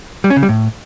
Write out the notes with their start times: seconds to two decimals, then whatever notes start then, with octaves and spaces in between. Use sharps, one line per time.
0.24 G3
0.30 C#4
0.36 C#3
0.43 G3
0.49 A2